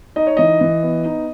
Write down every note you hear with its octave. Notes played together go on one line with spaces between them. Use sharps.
D#4 D#5
C#5
E3 D#5
E3
B3
D#4